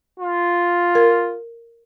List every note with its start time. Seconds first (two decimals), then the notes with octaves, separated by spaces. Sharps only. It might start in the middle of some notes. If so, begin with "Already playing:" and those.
0.20 F4
0.95 A#4